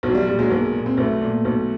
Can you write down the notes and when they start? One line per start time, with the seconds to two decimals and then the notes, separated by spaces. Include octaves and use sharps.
0.03 B1
0.08 F#3
0.15 G3
0.27 A#2 G3
0.39 F#3 G#3
0.50 B1 G#3 A#3
0.74 A#2
0.86 C4
0.97 B1 A3 B3
1.21 A#2
1.45 B1